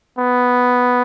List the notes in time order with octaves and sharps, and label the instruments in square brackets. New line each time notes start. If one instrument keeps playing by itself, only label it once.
[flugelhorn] B3